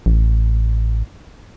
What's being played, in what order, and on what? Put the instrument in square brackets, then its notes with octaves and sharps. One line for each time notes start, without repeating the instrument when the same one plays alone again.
[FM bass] A1